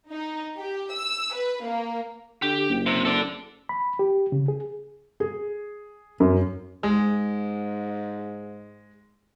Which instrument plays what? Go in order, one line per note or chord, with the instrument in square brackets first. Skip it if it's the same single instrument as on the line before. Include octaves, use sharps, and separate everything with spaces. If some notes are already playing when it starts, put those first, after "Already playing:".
[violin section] D#4
G4
E6
B4
A#3
[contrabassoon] D3 [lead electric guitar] G4
[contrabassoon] F#1
[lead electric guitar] C3
A4 D5
[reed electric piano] B5
G4
C#3
G#4
[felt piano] G#4
F#2
[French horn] G#2 [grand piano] G#3